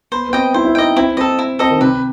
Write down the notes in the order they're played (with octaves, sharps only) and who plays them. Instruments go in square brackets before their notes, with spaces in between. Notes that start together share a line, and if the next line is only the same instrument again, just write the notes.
[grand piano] B3 [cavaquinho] C5
[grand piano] B3
[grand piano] C4 [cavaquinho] D#5 G5
[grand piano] E4 [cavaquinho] C5
[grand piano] E4
[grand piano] D#4 [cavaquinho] G5
[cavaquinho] D#5
[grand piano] C4 [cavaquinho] E4
[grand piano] C4 [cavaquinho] D#5
[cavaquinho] A4
E4
[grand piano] C4 [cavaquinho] A4 D#5
[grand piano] D#3
[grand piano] C3 [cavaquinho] B4